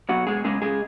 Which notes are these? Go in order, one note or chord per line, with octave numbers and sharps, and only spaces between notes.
B2 F#3 F#4
B2 G#3 G#4
C#3 G#3 G#4
C#3 G#3 G#4